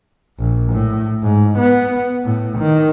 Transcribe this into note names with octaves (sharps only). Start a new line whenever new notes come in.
A#1
A2
G#2
B3
A2
D#3